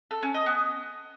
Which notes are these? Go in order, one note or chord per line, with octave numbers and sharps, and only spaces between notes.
A4
C#4
D#5
B3